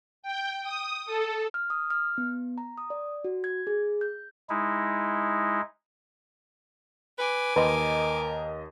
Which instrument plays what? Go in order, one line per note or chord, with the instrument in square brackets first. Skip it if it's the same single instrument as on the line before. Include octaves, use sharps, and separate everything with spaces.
[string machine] G5
D#6
A4
[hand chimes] F6
D#6
F6
B3
A#5
D#6
D5
F#4
G#6
G#4
G6
[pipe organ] G#3 D#4 E4
[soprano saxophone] B4 [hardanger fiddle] G#5 D6
[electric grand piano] D#2 D#5 [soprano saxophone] A#4 [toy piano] B4 B5 C6